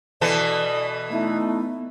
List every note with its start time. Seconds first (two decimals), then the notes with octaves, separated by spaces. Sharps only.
0.21 B2 E3 A4 D5
1.11 A3 B3 D#4 E4